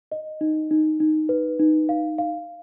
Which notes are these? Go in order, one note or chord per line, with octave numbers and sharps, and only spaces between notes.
D#5
D#4
D#4
D#4
B4
D#4
F5
F5